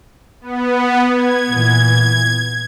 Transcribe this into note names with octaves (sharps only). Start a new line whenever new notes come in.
B3
G#6
A#2 E3